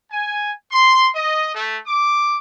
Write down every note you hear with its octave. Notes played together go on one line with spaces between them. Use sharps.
G#5
C6
D#5
A3
D6